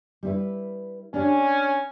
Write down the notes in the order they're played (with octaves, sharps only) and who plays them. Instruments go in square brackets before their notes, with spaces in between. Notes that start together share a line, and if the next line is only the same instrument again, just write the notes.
[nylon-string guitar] G3 E4 B4
[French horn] C#4 [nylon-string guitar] D4 G4